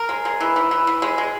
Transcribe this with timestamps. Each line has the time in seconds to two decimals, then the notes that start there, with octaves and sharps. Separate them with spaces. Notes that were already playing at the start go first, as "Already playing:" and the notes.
Already playing: A#4
0.09 G#3
0.25 G#3
0.40 E3
0.56 E3
0.71 E3
0.87 E3
1.02 G#3
1.18 G#3